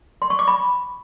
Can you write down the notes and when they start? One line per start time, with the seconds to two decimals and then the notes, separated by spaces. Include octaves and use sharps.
0.22 C6
0.30 C#6
0.39 D6
0.47 B5